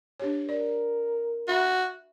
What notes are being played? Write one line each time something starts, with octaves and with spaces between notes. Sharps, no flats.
D4 G4 C#5
A#4 D5
F#4 E5 B5